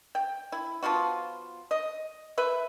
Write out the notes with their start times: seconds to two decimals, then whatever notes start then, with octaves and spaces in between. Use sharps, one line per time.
0.15 G5
0.52 E4
0.83 F3 B3 F4 F#4
1.71 D#5
2.38 B4 E5